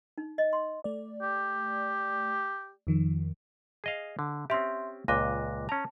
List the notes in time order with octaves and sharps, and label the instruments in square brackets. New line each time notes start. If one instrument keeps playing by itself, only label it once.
[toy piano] D#4
D#5
C6
[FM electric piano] A3 D5
[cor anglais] G4
[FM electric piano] F2 D#3 F3
[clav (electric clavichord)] G#4 D#5 F5
D3
[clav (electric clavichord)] C4 C#4 G4 [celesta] E5 C6
[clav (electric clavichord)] C#2 A#2 D#5 [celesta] D6 F#6 A#6
[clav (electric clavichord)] C#4 A#5 [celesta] A5